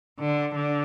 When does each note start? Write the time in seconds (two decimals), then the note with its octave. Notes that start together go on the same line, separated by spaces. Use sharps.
0.19 D3
0.54 D3